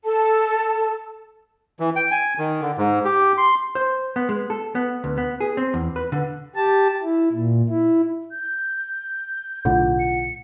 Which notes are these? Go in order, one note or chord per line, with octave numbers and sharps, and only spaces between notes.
A4 A5
E3
G5
G#5
D#3
D3
G#2
G4
C6
C5
B3
G#3
A4
B3
D2
B3
G#4
C4
E2
B4
D3
G4 A5
E4
A#2
E4
G6
B1 A2 D3 F4 F#5
C#7